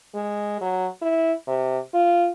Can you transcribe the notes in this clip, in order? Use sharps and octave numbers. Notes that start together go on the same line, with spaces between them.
G#3
F#3
E4
C3
F4